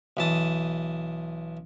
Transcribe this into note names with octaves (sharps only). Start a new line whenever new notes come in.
B1 E3 A5 D#6